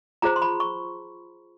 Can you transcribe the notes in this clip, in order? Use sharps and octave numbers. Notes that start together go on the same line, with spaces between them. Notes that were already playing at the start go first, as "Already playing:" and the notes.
F4 G#4 C5 A#5
C6
B5
C#6